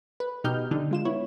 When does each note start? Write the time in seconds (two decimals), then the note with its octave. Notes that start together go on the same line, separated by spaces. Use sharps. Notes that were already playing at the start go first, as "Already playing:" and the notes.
0.20 B4
0.44 B2 D#4 G4 D#5 F6 G6
0.71 D3 D4 D#4
0.91 G#3 F4 E7
1.05 B3 E4 C#5